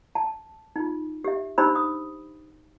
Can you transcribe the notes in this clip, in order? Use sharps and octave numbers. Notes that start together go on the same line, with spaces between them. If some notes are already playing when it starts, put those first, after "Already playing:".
A5
D#4 F4
G4 E5
D4 D#4 G4 C5 B5 E6
D#6